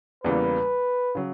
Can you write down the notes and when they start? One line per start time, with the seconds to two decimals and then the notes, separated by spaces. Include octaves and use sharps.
0.24 E2 C#3 E3 G3 A#3 B4
1.15 C#3 F#3